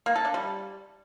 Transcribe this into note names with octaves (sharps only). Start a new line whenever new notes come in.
A#3
A4
D4
G3